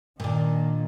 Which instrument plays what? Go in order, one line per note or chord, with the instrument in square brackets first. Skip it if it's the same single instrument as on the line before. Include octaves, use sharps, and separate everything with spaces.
[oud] A#2 D4 [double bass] D#3 A#3